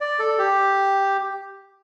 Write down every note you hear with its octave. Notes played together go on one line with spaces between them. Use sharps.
D5
A4
G4